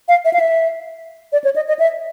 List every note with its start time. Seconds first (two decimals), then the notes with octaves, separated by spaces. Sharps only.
0.08 F5
0.25 E5
0.33 F5
0.39 E5
1.32 D5
1.44 C#5
1.56 D#5
1.68 D#5
1.79 E5